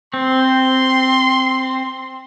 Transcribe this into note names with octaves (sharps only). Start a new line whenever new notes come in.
C4 C6